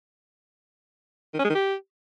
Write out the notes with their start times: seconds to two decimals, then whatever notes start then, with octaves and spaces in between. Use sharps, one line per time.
1.34 D#3
1.39 C#4
1.44 G#3
1.50 D#3
1.55 G4